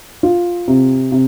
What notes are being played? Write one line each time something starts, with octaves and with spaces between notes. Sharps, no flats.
F4
C3
C3